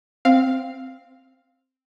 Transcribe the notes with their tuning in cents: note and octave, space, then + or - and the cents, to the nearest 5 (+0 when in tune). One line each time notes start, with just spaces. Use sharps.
C4 +0 F5 +0